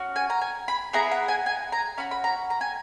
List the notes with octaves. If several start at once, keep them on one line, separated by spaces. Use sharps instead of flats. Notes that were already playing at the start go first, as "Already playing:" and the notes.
Already playing: C#4 F#4
G#5
A#5
G#5
B5
B3 E4 G#4 A#5
F#5
G#5
G#5
A#5
C#4 F#4 B5
B5
A#5
A#5
G#5